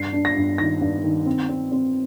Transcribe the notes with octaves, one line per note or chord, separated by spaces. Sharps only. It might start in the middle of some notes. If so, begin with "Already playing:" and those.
Already playing: G2 C7
D4
A#6
G2
D#3 A#6
G2
D#3
C4
C4
C4